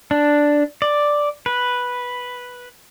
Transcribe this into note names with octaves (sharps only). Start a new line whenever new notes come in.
D4
D5
B4